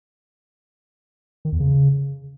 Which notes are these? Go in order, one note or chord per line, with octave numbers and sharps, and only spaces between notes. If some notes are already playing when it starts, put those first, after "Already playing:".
D#3
E2
C#3